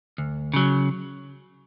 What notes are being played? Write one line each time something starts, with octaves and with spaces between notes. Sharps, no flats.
D2
C#3 F#3